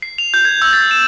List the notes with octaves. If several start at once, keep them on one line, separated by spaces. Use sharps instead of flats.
C7
F7
G6
G#6
E6
A6
E7